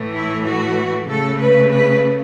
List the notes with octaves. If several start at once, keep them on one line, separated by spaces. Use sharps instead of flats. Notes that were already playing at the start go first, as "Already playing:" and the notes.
Already playing: A2 E3 A3
E4
F#4
C#3 A3 A4
B4
B4